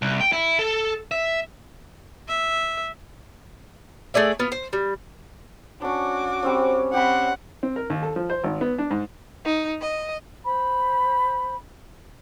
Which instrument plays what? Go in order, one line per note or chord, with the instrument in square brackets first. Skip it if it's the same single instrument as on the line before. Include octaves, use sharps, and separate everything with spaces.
[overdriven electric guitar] C2
G5
E4
A4
E5
[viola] E5
[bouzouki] A3 G#4 D5 E5
B3 F4
C5
G3
[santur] C#4 D4 [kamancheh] F#4 D6
[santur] G3 C4 C#4
[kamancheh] C4 [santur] G4 B5 [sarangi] F#5
[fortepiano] C4
A#4
D#2
A4
F3
C5
G#1
B3
D4
G#2
[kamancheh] D#4
D#5
[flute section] C5 B5